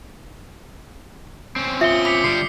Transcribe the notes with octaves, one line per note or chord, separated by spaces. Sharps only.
C4 C#4
F4 E5 D#6 C#7 G7
B5 D6 B6 C#7
D3 G3 C7